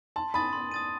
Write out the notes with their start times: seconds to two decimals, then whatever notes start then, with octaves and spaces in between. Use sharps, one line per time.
0.16 A5 C6
0.34 B5 D#6 A6 D#7
0.53 C6
0.71 D#6 A6 D#7